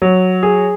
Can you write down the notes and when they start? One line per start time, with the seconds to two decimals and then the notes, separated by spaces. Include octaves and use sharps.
0.02 F#3
0.43 G#4